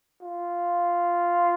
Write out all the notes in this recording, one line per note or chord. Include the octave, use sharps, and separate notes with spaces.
F4